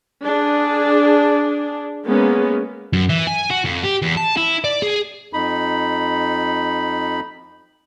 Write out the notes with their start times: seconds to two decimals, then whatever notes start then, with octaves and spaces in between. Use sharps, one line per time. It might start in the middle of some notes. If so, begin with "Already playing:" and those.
0.22 D4 G#4
2.05 G#3 A#3 B3 C#4
2.93 F#2
3.09 E3
3.27 G#5
3.50 F#4
3.65 F2
3.83 G4
4.02 E2
4.17 A5
4.37 E4
4.64 D5
4.82 G#4
5.33 F2 D#4 B5